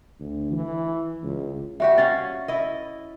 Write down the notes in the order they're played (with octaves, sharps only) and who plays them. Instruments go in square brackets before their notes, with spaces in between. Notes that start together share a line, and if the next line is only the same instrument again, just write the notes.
[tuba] D2
E3
C#2
[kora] G3 F#4 G4 [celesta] E5
[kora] C#4 F#4 F5 [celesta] A6
[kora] E4 D#5